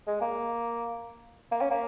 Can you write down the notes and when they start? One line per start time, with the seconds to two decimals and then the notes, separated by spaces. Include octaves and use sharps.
0.07 G#3
0.21 A#3
1.52 A#3
1.61 C#4
1.71 A#3